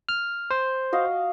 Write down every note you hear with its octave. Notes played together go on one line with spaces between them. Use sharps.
F6
C5
F#4 D#5 F5